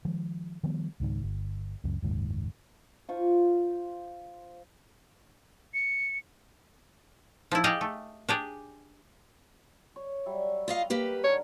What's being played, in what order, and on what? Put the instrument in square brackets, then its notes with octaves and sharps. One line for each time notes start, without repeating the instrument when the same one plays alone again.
[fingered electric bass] D#3 F3 G#3
D#3 F3 G3 B3
C#2 G#2 D#3
G1
C#2 F#2
F#1 D#2 G#2
[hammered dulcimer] F4 C5 C#6
[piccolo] C#7
[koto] F3 E4
G4 G#4 D5 D#5 F5 G5
A3
D4 G4 G#4
[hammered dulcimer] C#5
F#3 G3 E5
[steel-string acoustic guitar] F4 D#5 F5
A#3 G4 B4
[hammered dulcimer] D3 D#3 A#4 [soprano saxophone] C#5